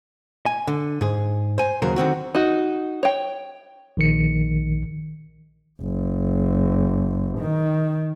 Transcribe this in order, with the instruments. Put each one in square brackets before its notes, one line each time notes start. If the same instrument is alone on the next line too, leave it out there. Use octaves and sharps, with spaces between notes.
[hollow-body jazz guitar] G#5
D3
G#2 G#4
C5 G#5
D#2 C#3 F#3 G#4 A#4 C5
D3 D#3 C4 F#4
[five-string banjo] D#4 F#4
C#5 G5
[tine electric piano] A#1 D#3 C#7
[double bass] F#1
D#3